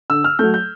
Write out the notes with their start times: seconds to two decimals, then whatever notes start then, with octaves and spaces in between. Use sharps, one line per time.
0.10 D3 E6
0.24 F6
0.39 F#3 A3 G6
0.54 G6